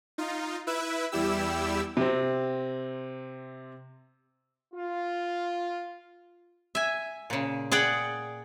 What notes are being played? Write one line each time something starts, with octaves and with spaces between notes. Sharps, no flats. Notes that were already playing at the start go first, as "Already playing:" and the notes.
D#4 F4
E4 B4 E5
E2 G3 E4 G4 E6
C3 C4
F4
E5 G#5
A#2 C#3
G#4 D5 F#5 G5